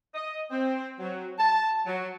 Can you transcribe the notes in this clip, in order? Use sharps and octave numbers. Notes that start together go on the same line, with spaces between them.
D#5
C4
F#3
A5
F#3